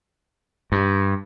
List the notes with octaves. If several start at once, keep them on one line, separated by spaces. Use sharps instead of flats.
G2